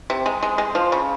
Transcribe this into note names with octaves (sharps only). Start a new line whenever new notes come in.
C3
G#3
G#3
G#3
F3
C#3